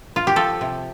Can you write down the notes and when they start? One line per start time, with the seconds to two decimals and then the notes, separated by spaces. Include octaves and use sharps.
0.16 F4
0.27 G4
0.36 F3 A4
0.61 C3